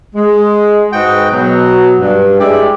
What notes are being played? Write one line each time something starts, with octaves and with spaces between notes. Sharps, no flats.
G#3
G#2 F#4 B4 D#5 G5
B2 F#3
G2
G#3 E4 G4 D5